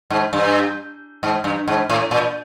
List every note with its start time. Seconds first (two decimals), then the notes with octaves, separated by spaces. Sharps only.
0.10 G#2
0.33 G2
1.23 G#2
1.44 G2
1.68 G#2
1.90 A2
2.11 A#2